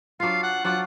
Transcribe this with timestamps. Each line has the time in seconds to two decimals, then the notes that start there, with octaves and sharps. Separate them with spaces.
0.20 F#3 D4 F4 F5
0.43 F#5
0.64 F#3 D4 F4 F#5